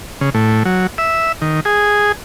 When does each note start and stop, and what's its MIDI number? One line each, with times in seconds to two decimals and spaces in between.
0.21 0.30 49
0.34 0.63 45
0.65 0.87 54
0.98 1.32 76
1.42 1.60 51
1.65 2.12 68